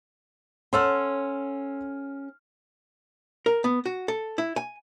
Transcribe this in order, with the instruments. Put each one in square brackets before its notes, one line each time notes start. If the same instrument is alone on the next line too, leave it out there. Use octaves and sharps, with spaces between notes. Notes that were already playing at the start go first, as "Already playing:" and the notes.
[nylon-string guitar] C#4 A4 F#5 [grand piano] C6 E6 F6
[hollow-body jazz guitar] A#4
B3
F#4
A4
E4
G#5